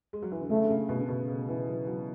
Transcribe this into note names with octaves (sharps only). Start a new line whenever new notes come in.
G#3
F#3
E3
D3
C#3 A3
D3
C#3
B2
C#3
B2
C#3
E3
F#3
F#3